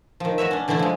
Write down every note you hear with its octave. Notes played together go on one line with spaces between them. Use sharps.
D#3 F3
F#4 B4 C#5 E5
C#4 D4
D3 E3 A3 D4 E4
F3 G#3